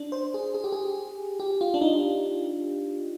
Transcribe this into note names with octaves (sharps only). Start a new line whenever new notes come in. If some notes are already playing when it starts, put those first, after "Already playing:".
Already playing: D4
C5
G#4
G#4
G4
G#4
G4
F4
D4
D#4